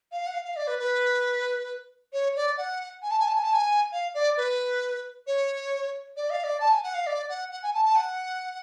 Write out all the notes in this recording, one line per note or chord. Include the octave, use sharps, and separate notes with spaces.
F5
F#5
F5
F5
D5
B4
B4
C#5
D5
F#5
G#5
A5
G#5
A5
G#5
A5
G#5
F5
D5
B4
C#5
D5
F5
D5
A5
G#5
F#5
F5
D5
F#5
F#5
G#5
A5
A5
F#5